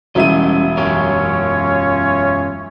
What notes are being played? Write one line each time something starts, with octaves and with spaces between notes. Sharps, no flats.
E1 G3 C#4 E4 D#5 D#7
F#2 C#4 F4 G4 A#4 C#5